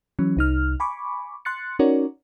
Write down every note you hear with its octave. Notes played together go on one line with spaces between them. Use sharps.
E3 F#3 C#4
C2 D#4 F6
G#5 B5 C#6 D6
C6 F#6 A6 C#7
C#4 D#4 F#4 A#4 C#5 D5